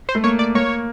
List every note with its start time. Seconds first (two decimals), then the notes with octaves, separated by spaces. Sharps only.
0.09 C5
0.15 A3
0.24 A#3 C#5
0.39 D5
0.55 A#3 C#5